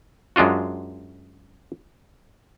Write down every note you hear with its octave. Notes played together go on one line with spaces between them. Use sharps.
F#2 G#3 D4 F4 F#4